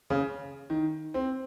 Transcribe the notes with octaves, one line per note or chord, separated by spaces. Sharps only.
C#3
D#3
C4